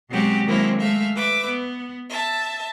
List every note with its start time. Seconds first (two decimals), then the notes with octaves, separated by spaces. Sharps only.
0.10 B2 F#3 G#3 C4 F#4 G4
0.45 D#3 F#3 G#3 A#3 C4 E4
0.80 G#3 A3 E5 F5
1.15 B4 E5 D6
1.46 B3
2.09 E5 A5